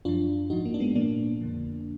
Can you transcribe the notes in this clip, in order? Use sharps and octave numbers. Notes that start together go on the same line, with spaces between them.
F#2 F3 D4 F4
G#2 F3 D#4 F#4
A#3
D4
G#3 B3
A#2 F3 A#3 D4
F2 D3 F3